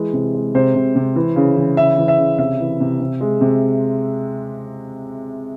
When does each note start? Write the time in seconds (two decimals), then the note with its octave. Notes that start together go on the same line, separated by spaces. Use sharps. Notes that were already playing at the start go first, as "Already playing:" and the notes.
Already playing: E3 G#3
0.13 C3
0.34 G#3
0.55 C3 C5
0.75 C3
0.96 C3
1.16 E3
1.36 C#3
1.57 E3
1.77 C#3 E5
1.98 E3
2.08 E5
2.18 C#3
2.38 C3 E5
2.60 E3
2.80 C3
3.00 C3
3.21 G#3
3.41 C3